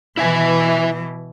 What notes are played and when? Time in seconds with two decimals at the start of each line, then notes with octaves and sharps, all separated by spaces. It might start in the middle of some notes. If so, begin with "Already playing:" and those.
0.17 B2 E3 E4 E5 G#5